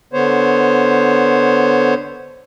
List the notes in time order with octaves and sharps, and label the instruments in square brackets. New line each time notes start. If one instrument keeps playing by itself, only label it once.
[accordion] D3 B3 C5 C#5